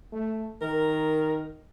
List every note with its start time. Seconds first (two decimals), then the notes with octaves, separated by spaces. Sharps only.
0.12 A3
0.62 D#3 A#4